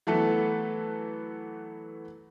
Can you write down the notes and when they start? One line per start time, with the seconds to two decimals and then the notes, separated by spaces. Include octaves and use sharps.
0.07 E3 F#3 A3 B3 A4 B4